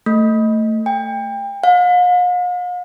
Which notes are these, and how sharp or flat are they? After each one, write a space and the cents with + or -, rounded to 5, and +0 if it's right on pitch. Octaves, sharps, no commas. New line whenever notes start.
A3 +20
G5 +30
F5 +45